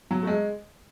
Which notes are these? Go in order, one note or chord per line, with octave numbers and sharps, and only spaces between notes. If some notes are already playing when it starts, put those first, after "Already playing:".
F#3
A3
G#3